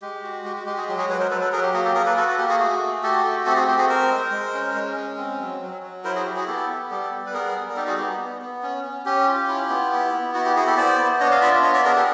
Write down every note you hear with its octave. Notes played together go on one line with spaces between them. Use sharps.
G#3 G4
F#4
G#3 G4
F#4
G#3 G4
F#4 G#4
F#3 G4
F#4 G#4
F#3 B4 C#5
A#4 C5
F#3 A4 B4
A4 B4
F#3 G#4 A#4
G4
A#3 F#4 G#4
G4 A4
A#3 G#4 A#4
A4 B4
F#4 A4 B4
A4 B4
A#3 G4 A4
F#4 G#4
A3 F#4 G#4
A3
F#4 G4 A4
A3
C4 G4 A4
F#4 G#4
C4 G4
F#4 G#4
C4 A#4 C5
G#3
G#3
C#4
G#3
C#4
C4
F#3
F#3
F#3
E4 A#4 C5
F#4 G#4
E4 G4
F#4 G#4
B3 G4 A4
B3
G3 G4 A4
G3
B4
B3 G#4 A#4
G3
A#4
D#4 G4 A4
F#4 G#4
B3 G4
B3
B3
C#4
C#4
C#4 G4
F4
E4
B3
E4
B3
E4 F#4
G4
E4 F#4 G#4
G4 A4
B3 C5 D5
B3
D4 C#5 D#5
D#5 F5
F4 D5 E5
B3 C#5 D#5
D5 E5
D4 G#4 A#4
G4 A4